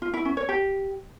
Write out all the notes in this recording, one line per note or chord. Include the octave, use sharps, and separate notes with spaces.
F4
E4
C#4
C#5
G4